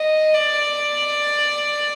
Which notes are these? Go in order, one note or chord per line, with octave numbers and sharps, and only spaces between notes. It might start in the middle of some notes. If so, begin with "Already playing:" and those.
Already playing: D#5
D5